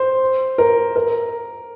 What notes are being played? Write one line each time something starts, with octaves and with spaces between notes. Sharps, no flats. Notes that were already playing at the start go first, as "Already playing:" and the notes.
Already playing: C5
A#4
A#4